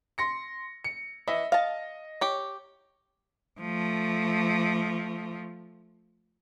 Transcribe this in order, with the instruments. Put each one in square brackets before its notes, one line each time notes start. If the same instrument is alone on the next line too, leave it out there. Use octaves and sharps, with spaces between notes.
[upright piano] C6 A#6 C#7
C#7
[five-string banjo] E3 [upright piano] D#5 E5
[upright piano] D#5 [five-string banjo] F5 A5
[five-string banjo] G4 C#5
[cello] F3 A3